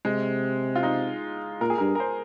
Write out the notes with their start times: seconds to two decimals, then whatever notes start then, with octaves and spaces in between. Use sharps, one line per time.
0.05 C3 G#3
0.75 F4
0.83 D#4
1.61 A#2 A#4
1.70 G#4
1.78 G2 A#4
1.95 A#4
2.00 C5